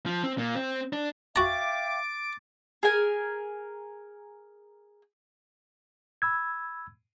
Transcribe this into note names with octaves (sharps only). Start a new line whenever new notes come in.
F3
C4
A#2
C4
D4
F#4 E5 F5 G5 A#5 D6 A6
G#4 A#4 G#5
B5 E6 G#6